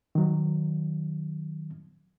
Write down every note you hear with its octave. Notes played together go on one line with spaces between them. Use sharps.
D#3 F#3